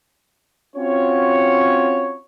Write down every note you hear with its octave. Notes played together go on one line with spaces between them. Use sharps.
C4 C#4 F4 F#4 C#5